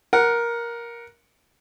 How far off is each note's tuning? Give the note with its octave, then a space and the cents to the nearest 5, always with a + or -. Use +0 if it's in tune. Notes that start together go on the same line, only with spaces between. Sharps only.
A#4 +10 F#5 +0